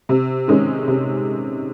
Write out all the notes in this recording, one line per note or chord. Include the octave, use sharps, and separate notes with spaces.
C3
D#3 G#3 C#4
C3